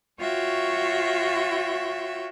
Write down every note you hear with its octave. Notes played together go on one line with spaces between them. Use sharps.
F4 F#4 C#5 E5 G5